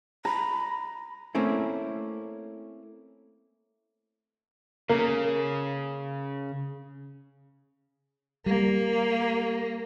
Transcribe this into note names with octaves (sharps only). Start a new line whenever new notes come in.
A#5 B5
A3 A#3 C4 C#4 E4
C#3 A#3
G3 A#3